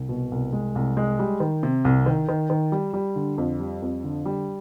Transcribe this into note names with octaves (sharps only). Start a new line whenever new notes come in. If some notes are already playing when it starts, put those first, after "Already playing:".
Already playing: C2
B2
C2
G#3
C2
G#3
G3
D#3
C3
C2
D#3
D#3
D#3
G3
G3
D3
F2
G3
F2
D3
G3